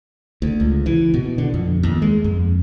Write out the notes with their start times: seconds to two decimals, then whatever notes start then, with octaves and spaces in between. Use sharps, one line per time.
0.42 D2
0.60 C#2
0.86 E3
1.14 B2
1.38 D3
1.54 F2
1.83 D#2
2.02 G#3
2.24 F2